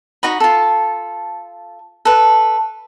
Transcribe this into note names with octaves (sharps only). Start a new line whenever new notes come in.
D#4 F#4 D#5 B5
F4 A4
A4 B4